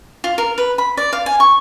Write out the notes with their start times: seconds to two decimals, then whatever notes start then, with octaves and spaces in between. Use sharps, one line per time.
0.24 F4
0.38 A#4
0.58 B4
0.78 B5
0.97 D5
1.13 F5
1.26 G#5
1.40 C#6